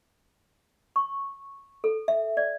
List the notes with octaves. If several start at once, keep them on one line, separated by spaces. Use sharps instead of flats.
C#6
A4
E5
D5